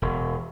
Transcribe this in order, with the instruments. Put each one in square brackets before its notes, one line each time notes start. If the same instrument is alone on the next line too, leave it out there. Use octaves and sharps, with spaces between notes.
[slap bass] E1